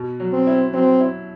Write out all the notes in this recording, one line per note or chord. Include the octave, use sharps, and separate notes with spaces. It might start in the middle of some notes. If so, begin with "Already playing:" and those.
Already playing: B2
F#3
C4
E4
F#3 C4
E4